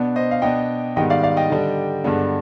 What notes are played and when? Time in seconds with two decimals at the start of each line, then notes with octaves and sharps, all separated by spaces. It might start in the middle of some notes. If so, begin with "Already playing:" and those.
Already playing: B2 B3 D4
0.16 C5 D#5
0.31 F5
0.42 B2 B3 D4 D#5 G5
0.96 G#2 D#3 G3 B3 D#5 G5
1.10 D5 F5
1.23 D5 F5
1.37 D#5 G5
1.50 D3 G3 D4
2.04 G2 D3 G#3 B3 D4